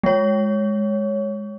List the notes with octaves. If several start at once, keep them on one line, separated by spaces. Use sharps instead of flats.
G#3 C#5